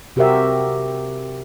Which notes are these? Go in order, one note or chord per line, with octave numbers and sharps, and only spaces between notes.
C3 F#4 G4 A#4 C5 E5